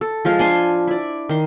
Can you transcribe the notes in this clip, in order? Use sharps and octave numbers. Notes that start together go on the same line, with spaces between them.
A4
F3 G#3 F4
D4 G#5 C6
E4 D5
D#3 C6